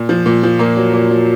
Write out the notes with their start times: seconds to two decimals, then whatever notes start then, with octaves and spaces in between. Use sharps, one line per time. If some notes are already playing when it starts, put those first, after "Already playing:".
Already playing: A#2
0.09 F3
0.26 A#2
0.43 F3
0.59 A#2 A#3
0.77 F#3
0.94 A#2
1.10 F#3